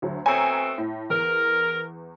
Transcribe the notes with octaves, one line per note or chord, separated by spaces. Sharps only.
D2 F#3
B2 A3 C4 C#5 G#5 A#5
A2
E2 A#4